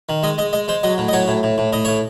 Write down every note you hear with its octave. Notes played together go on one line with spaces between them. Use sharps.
D#3
G#3 D#5
G#3 D#5
G#3 D#5
G#3 C5
F#3 D#5
A2
D#5
F#3 C#5
A2
A2
A2
A2 D#5
A2 C#5